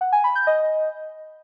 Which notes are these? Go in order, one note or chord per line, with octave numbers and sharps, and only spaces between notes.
F#5
G#5
B5
G6
D#5